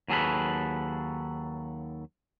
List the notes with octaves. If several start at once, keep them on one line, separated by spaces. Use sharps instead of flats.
D#2 F#3 G#4 A4 B4